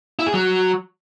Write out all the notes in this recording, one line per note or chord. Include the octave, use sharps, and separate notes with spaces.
E4
G#4
F#3